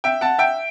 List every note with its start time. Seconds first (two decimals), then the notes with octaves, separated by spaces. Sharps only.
0.04 E5 G5
0.21 F#5 A5
0.39 E5 G5